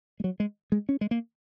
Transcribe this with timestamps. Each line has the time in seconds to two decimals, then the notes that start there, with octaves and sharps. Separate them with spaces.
0.20 G#3
0.24 F#3
0.40 G#3
0.72 G#3
0.89 C#4
1.01 G#3
1.11 A#3